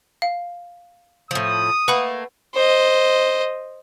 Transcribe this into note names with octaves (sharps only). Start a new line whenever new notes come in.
F5
A2 F3 D#6
A3 A#3 B4 F#5 B5
C5 D#5